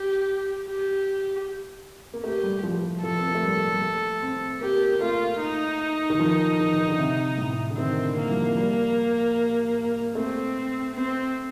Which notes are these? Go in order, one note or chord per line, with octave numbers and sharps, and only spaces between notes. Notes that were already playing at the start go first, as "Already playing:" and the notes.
Already playing: G4
G4
A#3
A3 G4
G3
F3
F3
F3 A4
C4
A#3
A3
G3
G3
A3
C4
A#3 G4
A#3
A3 F4
D#4
D#3
F3
D#3
D#3
D3
C3
A2
D3
D#3 C4
D3
A#3
G3
F3
F3
G3
A3 C4
C4